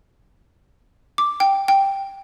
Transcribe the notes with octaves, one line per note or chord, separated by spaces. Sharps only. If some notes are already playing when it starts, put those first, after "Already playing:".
D6
G5
G5